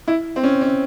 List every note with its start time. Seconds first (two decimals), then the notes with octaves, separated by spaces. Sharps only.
0.08 E4
0.36 C4
0.44 C#4
0.61 C#4